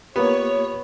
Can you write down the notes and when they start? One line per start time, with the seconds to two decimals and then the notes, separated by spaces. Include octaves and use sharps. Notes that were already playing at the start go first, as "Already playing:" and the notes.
0.16 A#3 B3 F4 G4 C#5